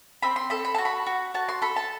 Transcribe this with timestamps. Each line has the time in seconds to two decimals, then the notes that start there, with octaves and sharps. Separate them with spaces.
0.22 C4 B5
0.36 C6
0.50 A4 B5
0.65 B5
0.75 F#4 A5
0.85 B5
1.06 F#4
1.34 F#4 A5
1.49 C6
1.62 A4 B5
1.76 A5